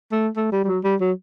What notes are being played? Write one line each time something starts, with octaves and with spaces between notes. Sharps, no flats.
A3
A3
G3
G3
F#3
G3
F#3